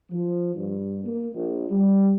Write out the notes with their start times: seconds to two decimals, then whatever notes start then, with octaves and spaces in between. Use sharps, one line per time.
0.11 F3
0.56 G2
1.05 A#3
1.34 A#1
1.70 G3